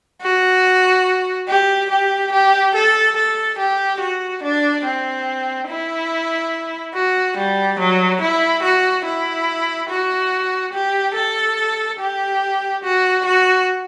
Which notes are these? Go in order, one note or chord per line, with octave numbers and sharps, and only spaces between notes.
F#4
G4
G4
G4
A4
A4
G4
F#4
D4
C4
E4
F#4
G3
F#3
E4
F#4
E4
F#4
G4
A4
G4
F#4
F#4